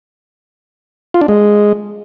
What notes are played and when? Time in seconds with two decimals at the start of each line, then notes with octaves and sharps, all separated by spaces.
1.14 F4
1.21 D4
1.28 G#3